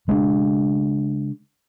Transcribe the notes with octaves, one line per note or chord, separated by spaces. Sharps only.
C#3 G#3 D4